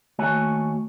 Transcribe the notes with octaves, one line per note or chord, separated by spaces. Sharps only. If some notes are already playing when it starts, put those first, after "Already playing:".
D#2 A3 F#4 C#5 G#5